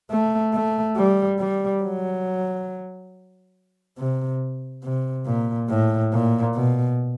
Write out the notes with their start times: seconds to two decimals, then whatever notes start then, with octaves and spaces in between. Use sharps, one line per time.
0.11 A3
0.53 A3
0.96 G3
1.39 G3
1.82 F#3
3.97 C3
4.83 C3
5.25 A#2
5.69 A2
6.12 A#2
6.55 B2